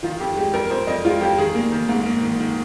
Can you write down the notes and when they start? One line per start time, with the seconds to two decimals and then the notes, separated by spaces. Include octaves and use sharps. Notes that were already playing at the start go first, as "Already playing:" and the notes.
0.03 D#3 F4
0.20 F2 G4
0.37 G#3 G4
0.53 F2 A#4
0.70 F2 C5
0.87 F2 D#5
1.05 G#3 F4
1.21 F2 G4
1.38 D#3 G#4
1.55 A#3
1.72 D#3
1.89 G#2
2.06 A#3
2.23 D#3
2.40 D#3